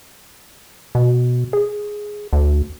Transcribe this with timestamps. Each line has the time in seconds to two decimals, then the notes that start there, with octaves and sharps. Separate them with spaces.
0.95 B2
1.53 G#4
2.33 D2